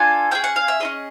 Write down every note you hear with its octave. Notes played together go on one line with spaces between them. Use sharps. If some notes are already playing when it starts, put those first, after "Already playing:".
Already playing: D4 F4 A4 G#5
C#4 E4 G#4 G5
F#5
F5
E5
C#4 E4 G#4 D#5